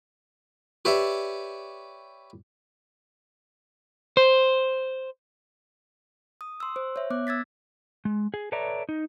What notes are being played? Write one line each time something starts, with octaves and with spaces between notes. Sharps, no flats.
G4 B4 C#5 D5 E5
C5
D#6
C6 E6
C5
C#5 E5
B3 D6 F#6
E6 G#6 A6 B6
G#3
G#4
A4 B4 C#5 D5 E5 A#5
D#4